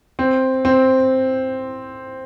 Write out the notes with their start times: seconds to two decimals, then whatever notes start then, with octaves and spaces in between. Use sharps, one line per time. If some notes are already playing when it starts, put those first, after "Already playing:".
0.19 C4
0.65 C4